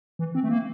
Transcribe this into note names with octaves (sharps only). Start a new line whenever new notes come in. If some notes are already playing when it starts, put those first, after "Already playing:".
E3
C4
A3
A#3